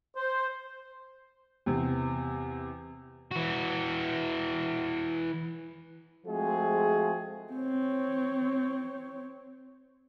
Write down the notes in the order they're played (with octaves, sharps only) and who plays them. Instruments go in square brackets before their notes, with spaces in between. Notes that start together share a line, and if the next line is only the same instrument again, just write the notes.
[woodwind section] C5
[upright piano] E2 C3 C4
[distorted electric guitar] E3 F#4
[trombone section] F3 G#3 A3 C4 F#4 G#4
[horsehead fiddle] C4 C#5